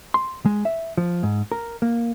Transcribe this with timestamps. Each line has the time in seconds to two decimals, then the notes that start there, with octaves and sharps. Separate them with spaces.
0.14 C6
0.46 G#3
0.65 E5
0.97 F3
1.23 G#2
1.52 A#4
1.82 A#3